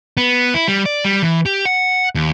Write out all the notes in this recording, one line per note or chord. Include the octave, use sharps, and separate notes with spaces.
B3
E4
G3
D5
G3
E3
G4
F#5
D#2